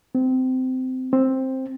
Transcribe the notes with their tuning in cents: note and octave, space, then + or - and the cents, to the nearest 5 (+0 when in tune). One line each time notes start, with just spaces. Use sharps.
C4 -20
C4 +10